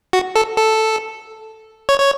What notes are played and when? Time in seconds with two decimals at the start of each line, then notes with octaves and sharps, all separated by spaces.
0.13 F#4
0.36 A4
0.57 A4
1.89 C#5
2.00 C#5